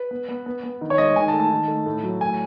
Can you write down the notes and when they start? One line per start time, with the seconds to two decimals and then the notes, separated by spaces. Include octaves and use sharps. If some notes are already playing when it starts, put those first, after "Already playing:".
Already playing: B4
0.11 B3
0.29 B3
0.46 B3
0.63 B3
0.81 D#3
0.90 C#5
0.98 G#3 D#5
1.16 D#3 G#5
1.28 A5
1.33 A3
1.40 A5
1.51 D#3
1.68 A3
1.86 A2
2.03 F#3
2.21 A2 G#5